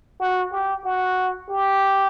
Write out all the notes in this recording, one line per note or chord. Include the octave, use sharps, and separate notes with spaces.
F#4
G4
F#4
G4